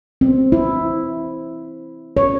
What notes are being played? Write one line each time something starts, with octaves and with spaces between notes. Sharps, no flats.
C4
E4
C#5